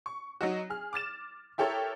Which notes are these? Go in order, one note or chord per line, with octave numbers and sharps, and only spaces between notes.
C#6
F#3 D#4 F#4
G#4 F6
D6 F6 A6 E7
E4 G4 A4 A#4 C#5